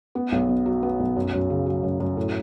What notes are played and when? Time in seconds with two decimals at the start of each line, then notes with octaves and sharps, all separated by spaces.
0.15 B3
0.32 B1
0.49 B2
0.66 F#3
0.83 B3
1.00 B1
1.16 F#2
1.33 F#2
1.50 C#3
1.66 F#3
1.83 F#2
2.00 F#2
2.17 A2